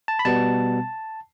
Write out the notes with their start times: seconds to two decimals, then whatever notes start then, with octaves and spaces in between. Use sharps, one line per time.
0.08 A5
0.19 B5
0.25 B2 G3 B3 A5